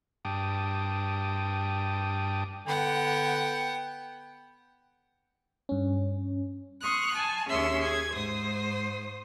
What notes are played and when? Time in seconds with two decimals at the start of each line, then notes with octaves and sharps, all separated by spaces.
0.25 G2 G5 A5 D6 D#6
2.67 D3 B3 F#5 G5
5.69 G2 C#4
6.81 C6 C#6 D#6 F6 F#6
7.16 G#5 A5
7.49 D#2 C#4 G#4 E5 C6 E6
7.81 G#4 G#6
8.12 G#2 C5 D#6